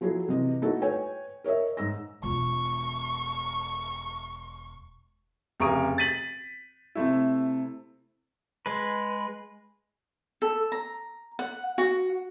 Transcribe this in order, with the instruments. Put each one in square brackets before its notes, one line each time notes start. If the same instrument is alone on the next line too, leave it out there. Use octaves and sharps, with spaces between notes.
[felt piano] F3 F#3 E4 G#4 A4
C3 E3 D#5
A3 D#4 E4 F#4 A4
B4 C#5 G5 G#5
A#4 C#5 D#5 E5
G#2 E6 A#6
[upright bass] E1 F4 [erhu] C#6
[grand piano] F1 C#3 A#5 C#6 D#6 D7
A6 B6 D#7 F#7
C3 A3 E4
[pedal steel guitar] G#3 B4
[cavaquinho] A4
A#5
F#5
F#4